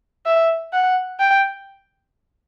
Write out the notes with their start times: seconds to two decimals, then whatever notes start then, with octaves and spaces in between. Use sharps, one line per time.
0.26 E5
0.73 F#5
1.20 G5